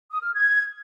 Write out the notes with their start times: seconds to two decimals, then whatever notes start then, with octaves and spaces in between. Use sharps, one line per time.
0.11 D#6
0.22 F6
0.33 G#6